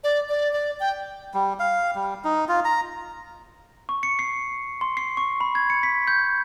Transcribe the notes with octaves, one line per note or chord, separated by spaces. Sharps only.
D5
D5
D5
G5
G3
F5
G3
D#4
F4
A#5
C#6
C#7
C7
C6
C7
C#6
B5
G#6
C#7
B6
G6